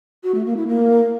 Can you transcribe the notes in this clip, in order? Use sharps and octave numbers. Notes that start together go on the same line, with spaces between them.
F#4
A3
A#3
E4
A#3